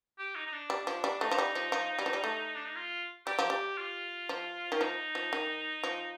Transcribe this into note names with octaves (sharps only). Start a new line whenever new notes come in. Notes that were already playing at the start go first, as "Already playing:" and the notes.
G4
D#4
D#4
D4
G3
F3
G3
A3 D#4
F3
G3
F3
F3
G3
F3
G3
A3
D4
D#4
F4
G3 G4
F3
G3
F4
F3
D#3
F3 D#4
F3
D#3
F3